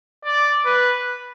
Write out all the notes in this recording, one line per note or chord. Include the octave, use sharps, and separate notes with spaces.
D5
B4